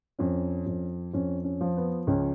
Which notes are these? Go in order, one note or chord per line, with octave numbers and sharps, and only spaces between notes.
F2 C#4
F2
F2 C#4
C#4
F3
B3
C#2 C#4